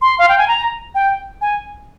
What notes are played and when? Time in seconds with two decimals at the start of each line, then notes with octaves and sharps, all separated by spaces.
0.02 C6
0.19 F5
0.29 G5
0.38 G#5
0.48 A#5
0.95 G5
1.41 G#5